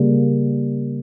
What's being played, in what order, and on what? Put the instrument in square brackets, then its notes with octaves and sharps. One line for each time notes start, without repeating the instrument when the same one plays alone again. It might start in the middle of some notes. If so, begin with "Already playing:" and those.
Already playing: [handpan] C#3 G3 A#3